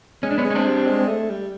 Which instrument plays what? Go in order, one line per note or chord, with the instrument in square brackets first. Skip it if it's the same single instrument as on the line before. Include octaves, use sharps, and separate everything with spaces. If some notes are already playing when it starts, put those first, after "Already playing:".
[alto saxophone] G#3 [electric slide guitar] C#4
[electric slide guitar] D4
B3 C#4
[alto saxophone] G#3
[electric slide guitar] C#4
C4 D4
[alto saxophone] G3
G#3
A3
G3